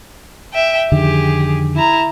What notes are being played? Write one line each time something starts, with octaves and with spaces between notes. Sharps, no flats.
E5 G5
F2 D3 D#3 G4 G#4
E4 A#5